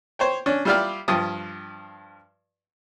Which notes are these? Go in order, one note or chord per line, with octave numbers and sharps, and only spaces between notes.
C5 C#5 G5
C#4 D4
G3 E4 F4 G4 D5 F6
G2 F3 D#6